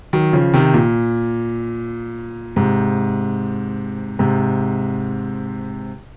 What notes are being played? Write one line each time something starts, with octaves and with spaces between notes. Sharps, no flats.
D#3 F#3
C#3 F3
C3 D#3
A#2
G#2 C3
G#2 C3